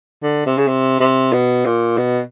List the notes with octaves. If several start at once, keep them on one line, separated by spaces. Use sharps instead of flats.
D3
C3
C#3
C3
C3
B2
A#2
B2